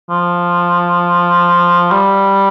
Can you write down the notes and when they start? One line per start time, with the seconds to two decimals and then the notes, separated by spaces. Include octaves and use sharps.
0.10 F3
1.91 G3